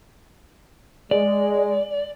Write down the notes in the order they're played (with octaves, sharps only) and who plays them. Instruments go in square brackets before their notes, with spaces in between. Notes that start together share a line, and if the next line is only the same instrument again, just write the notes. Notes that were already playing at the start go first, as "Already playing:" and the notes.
[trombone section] G#3 [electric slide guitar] D5